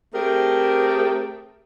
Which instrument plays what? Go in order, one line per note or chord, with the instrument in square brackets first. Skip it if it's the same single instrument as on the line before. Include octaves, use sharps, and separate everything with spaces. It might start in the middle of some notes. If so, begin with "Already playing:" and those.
[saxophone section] A3 C4 G4 G#4 A#4